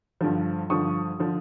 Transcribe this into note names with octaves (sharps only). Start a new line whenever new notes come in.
G2 D3 F3
G2 D3 F3 C#6 D#6
D3 F3